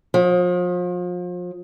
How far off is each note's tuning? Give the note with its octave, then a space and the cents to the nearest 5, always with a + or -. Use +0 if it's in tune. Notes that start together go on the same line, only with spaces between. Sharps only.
F3 +35